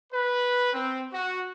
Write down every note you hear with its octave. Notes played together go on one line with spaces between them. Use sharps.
B4
C4
F#4